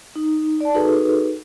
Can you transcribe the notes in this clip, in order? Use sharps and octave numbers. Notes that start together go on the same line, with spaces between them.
D#4
D5 A5
D#4 F#4 G#4 A4 B4